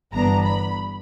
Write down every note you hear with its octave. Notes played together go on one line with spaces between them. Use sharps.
G1 G2 E3 B3 D4 A#5
B5